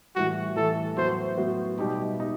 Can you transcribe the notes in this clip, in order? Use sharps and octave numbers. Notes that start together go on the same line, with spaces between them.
A2 E3 G3 F#4
A2 E3 G3 A4
A2 F#3 B3 F#4 C5
A2 F#3 B3 F#4
B2 G3 D#4 G4
G3 D#4